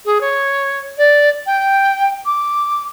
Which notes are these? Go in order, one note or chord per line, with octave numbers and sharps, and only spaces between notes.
G#4
C#5
D5
G5
D6